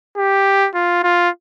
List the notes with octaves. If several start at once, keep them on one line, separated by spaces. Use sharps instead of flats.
G4
F4
F4